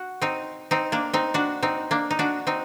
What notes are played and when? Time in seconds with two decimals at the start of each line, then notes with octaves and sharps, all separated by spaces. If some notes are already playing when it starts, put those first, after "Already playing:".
Already playing: F#4
0.22 C4 D#4
0.71 C4 D#4
0.92 A#3 D4
1.13 C4 D#4
1.34 D4 F#4
1.63 C4 D#4
1.91 A#3 D4
2.11 D#4
2.19 D4 F#4
2.47 C4 D#4